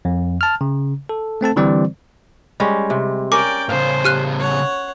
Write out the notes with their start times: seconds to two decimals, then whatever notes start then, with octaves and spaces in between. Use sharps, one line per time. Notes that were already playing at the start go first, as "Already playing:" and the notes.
0.05 F2
0.41 A5 F6
0.61 C#3
1.09 A4
1.41 A3 C4 A4 A5
1.56 D3 E3 G3 C4 C5 D5
2.60 G3 G#3 C#4
2.90 C3
3.32 C#4 A#4 D5 G5 D6
3.69 A2 C#3 C5 F5
4.05 G4 F6 F#6
4.39 C#5 F#5